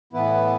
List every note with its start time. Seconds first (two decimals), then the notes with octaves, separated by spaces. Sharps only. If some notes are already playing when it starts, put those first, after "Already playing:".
0.13 A2 E3 B3 E4 B4